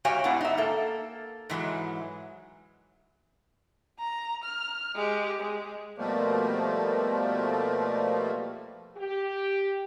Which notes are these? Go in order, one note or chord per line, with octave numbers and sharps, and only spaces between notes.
G#2 F#4 G4 C#5 F5 G#5
G#2 B3 D4 E4 F#5
D#4 E5
A#3 A4
G#2 E3 F#3 G#3
A#5
F6
G#3 G4
G#3
B2 F3 G3 A3 A#3
G4